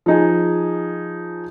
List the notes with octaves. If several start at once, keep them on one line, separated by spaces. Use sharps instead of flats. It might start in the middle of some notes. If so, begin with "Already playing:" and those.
F3 D#4 G#4